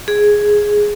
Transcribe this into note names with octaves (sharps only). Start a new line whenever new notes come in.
G#4